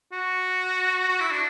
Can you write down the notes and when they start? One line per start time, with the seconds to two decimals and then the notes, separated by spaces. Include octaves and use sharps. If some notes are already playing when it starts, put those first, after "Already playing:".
0.12 F#4
1.09 F#4
1.20 E4
1.31 D4